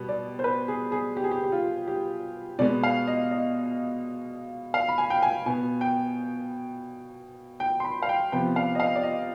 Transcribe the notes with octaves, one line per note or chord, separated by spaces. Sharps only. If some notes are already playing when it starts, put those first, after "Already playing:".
Already playing: B2 G3 B3
D5
C5
B4
G#4
G#4
G4
G#4
G4
G4
F4
G4
B2 G#3 B3 D5
F5
D#5
D#5
F5
B5
G#5
G5
G#5
B2 B3 G#5
G5
G5
C6
B5
F5
G5
C3 F3 B3 G5
F5
D#5
F5
D5
D#5